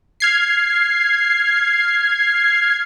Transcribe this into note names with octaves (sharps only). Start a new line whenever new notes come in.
F6 G#6 C7